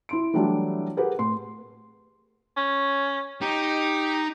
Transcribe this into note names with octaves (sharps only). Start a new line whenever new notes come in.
E4 C6 D7
E3 F#3 G3 A3 D4 E4
G4 G#4 A#4 B4 F#5
A2 C6
C#4
D#4 G4